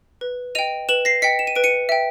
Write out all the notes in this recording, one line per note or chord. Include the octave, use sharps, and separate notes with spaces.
B4
D#5 G5 D#7 F7
B4 E7 F#7
A#6 C7
D#5 G5 B6 C#7
E7
D#7
B4 D7
C#7 D#7
E5 G5